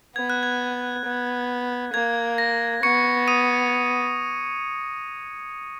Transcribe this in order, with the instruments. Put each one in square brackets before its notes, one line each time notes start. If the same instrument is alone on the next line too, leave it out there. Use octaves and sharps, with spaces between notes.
[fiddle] B3 [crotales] G#6
[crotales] F#6
G#6
[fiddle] B3
[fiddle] A#3 [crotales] G#6
[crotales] A#6
[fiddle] B3 [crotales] C#6 C#7
[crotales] D#6 D#7